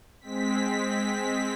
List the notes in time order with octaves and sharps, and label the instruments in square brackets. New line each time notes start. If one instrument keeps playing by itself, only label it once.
[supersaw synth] G#3 C4 B6